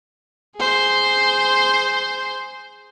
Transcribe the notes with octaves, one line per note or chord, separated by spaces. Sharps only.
G#4 C5